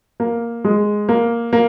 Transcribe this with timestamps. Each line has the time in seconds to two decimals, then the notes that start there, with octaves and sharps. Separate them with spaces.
0.20 A#3
0.65 G#3
1.09 A#3
1.53 A#3